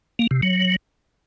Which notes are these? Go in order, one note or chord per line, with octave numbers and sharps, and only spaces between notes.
A#3
C3
F#3